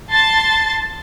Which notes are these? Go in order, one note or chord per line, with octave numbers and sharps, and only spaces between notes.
A5 C6 A6